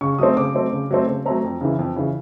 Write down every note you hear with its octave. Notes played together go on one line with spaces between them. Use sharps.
C#3 C#6
F#3 A3 C4 D#6
C#3 D6
F#3 A3 C4
C#3
F#3 A3 C4
C#3
F#3 A3 C4 A#5
F2
C#3 E3
F2
C#3 E3